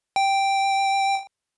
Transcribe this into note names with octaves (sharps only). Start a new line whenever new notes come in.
G5